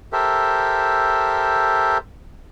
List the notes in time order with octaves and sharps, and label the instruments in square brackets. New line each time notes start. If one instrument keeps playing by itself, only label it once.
[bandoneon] G4 A4 A#4 C5 E5